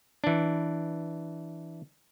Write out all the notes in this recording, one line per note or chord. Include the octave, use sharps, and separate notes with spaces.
E3 D4